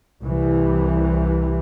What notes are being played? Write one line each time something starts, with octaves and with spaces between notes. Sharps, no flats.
C2 C3 E3